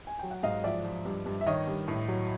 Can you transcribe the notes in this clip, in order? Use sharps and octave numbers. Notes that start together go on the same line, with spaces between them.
G#5
F#3 G5
F#5
G#2 D#5 F5
F3 D5 E5
F3
G2
G2
E5
D#3 C#5 D#5
G2
A2
F#3